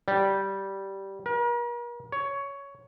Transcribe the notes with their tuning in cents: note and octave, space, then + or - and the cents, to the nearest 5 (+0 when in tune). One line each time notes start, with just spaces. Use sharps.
G3 -10
A#4 +40
C#5 +10